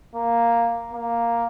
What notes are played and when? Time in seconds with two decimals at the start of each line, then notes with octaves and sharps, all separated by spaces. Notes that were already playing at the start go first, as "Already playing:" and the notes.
0.15 A#3
0.94 A#3